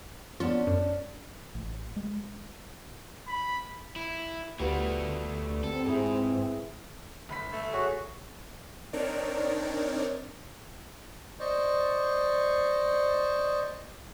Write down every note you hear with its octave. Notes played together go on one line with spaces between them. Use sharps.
B3 C#4 D4 F4
F#2
A1
G#3
B5
E4
D2 G3 A3 B3 F4 F#4
C4 A4
G#2 E4 G#4
G1 B5 B6
A3
F#4 G#4 C#5 E5
C4 D4 D#4 A#4 C#5 D5
C5 D5 D#5 C#6